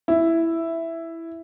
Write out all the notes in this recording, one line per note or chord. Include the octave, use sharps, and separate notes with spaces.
E4